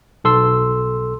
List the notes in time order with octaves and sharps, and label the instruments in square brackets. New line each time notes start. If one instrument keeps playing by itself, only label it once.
[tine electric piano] B1 A4 C6 E6